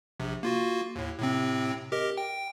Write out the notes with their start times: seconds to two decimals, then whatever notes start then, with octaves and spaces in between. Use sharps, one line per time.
0.20 A#1 C3
0.43 A#3 F4 F#4
0.96 D#2 A2
1.19 A2 C3 C4
1.92 G4 A#4 D#5
2.18 G5